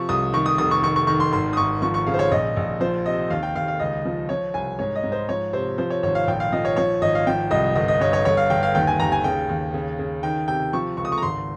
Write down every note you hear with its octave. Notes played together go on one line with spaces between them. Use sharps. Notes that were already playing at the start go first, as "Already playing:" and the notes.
Already playing: C3 F3 C#6
C2 D#6
D#3 C#6
D#6
F1 D#6
C#6
D#3 C#6
C#6
D#3 C#6
C6
G#1 C6
D#6
G#1 C#6
F3 C#6
C#6
C#3 F5
C5
C#5
A#1 D#5
A#1
F3 C5
C3 D#5
D#2 F5
G5
D#2 F5
F5
C#2 D#5
F3
F3 C#5
C2 G#5
G#2 C#5
D#5
G#2
C5
F3 C#5
C3 C5
F3 C5
C#5
G#1 C#5
F5
A#1 G5
F5
F3 D#5
C#5
F3 C#5
G#1 D#5
F5
F3 G5
C2 D#5
G1 D#5
D#5
G2 C#5
C#5
G1 C#5
F5
G1 G5
F5
D#2 G5
G#5
D#2 A#5
G#5
C#3 G5
D#2
C#3
C#3
D#3 G5
C3 G5
F3 C#6
C#2 C#6
D#6
C#6
A#5
G#1 C6